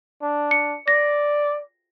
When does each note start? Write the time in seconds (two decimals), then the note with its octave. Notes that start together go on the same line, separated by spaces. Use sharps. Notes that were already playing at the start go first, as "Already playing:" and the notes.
0.22 D4
0.51 C#7
0.88 D5 A#6